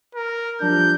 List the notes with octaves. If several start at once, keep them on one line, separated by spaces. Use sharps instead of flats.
A#4
F3 G3 D4 G6